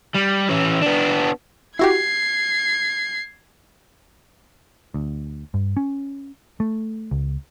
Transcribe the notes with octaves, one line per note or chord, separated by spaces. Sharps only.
G3
E3 C#4
B3 D4
E4 F#4 G4 G#6 C7
D2
G2
C#4
A3
C#2